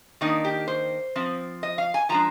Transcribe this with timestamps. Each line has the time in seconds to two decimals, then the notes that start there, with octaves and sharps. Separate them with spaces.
0.21 D#3 A#3 D4 D#4
0.44 G4
0.68 C5
1.16 F3 C4
1.63 D#5
1.78 F5
1.94 G#5
2.09 F3 G#3 D4 A#5